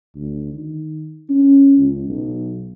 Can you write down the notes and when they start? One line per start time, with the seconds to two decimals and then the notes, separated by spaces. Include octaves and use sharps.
0.15 D2
0.53 D#3
1.30 C#4
1.78 C#2
2.08 B1